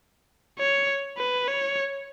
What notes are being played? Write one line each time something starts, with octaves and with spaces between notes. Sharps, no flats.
C#5
B4
C#5